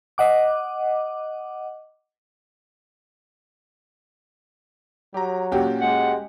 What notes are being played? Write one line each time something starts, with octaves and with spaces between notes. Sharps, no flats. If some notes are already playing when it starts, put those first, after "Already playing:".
D#5 F#5 D6
F#3 G4 A#5
A#2 A#3 C#4 F#4 G4
G#3 F#5